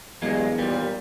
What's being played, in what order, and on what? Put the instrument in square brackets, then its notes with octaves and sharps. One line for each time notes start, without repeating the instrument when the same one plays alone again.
[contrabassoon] E2 [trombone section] G2 G#4 [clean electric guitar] F#3 G#3 A#3
[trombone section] D#2 A#2 [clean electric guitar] G3